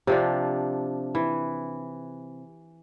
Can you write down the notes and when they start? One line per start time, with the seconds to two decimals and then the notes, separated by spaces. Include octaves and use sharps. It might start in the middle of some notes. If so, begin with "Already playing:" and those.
0.07 C3 F3 D4
1.15 E3